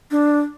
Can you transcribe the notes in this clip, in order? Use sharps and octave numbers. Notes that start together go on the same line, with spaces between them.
D4